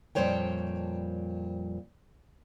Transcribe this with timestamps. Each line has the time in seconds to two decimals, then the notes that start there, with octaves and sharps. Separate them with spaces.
0.15 F2 A#2 G3 C5 C#5 G5